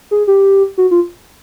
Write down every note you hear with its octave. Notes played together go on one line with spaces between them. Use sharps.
G#4
G4
F#4
F4